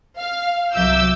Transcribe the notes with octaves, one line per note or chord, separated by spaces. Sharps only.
F5
C2 F#3 E5 D6 E6 G6